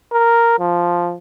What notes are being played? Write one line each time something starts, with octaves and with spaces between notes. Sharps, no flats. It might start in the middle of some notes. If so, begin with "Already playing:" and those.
A#4
F3